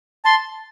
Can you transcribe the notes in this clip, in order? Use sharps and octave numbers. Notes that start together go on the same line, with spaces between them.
A5 C6